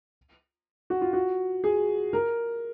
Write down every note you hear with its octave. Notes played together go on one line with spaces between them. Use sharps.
F#4
F4
F#4
G#4
A#4